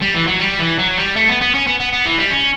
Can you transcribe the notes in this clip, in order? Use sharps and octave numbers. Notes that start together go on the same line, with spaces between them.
G3
E3
F#3
G3
E3
F#3
G3
A3
B3
B3
C#4
B3
B3
B3
E3
G3
C#4